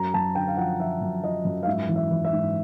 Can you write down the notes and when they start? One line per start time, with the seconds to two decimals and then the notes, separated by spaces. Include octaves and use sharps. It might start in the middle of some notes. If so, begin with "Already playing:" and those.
Already playing: F#2 A#5
0.14 F#2 A5
0.35 D3 G5
0.47 F5
0.57 F3 F#5
0.79 F3 E5
1.01 F#2
1.24 F3 D#5
1.45 F#2
1.63 F5
1.67 G#2 E5
1.88 E3
1.96 E5
2.10 E3
2.24 E5
2.33 G#2